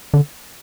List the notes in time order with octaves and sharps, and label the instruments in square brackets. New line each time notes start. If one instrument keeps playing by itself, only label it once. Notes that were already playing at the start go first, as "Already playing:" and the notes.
[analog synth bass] D3